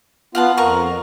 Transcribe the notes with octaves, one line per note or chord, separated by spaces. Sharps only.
B3 F4 F5 F#5 A5
F2 A#4 A#5 C#6